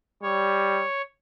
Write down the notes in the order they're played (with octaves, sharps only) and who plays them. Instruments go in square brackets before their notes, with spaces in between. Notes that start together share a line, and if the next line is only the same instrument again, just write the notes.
[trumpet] G3 [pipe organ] C#5